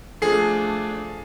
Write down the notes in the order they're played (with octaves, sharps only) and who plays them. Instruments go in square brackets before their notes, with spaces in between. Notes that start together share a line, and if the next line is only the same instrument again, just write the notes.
[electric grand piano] F3 G#4 C7 [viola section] A3 D4 [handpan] A4